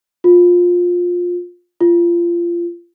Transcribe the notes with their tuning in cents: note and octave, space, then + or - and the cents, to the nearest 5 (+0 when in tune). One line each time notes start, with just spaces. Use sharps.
F4 +20
F4 -25